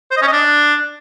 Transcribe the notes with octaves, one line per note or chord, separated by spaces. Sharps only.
C5
D#5
C#4
D#5
D4